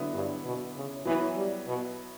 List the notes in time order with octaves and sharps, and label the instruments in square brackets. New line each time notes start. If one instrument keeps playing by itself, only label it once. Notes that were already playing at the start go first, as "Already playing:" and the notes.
Already playing: [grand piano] D3 F#3 B3 E4
[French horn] G2
B2
C#3
[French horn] E3 [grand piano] F#3 B3 E4 B4
[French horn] G3
B2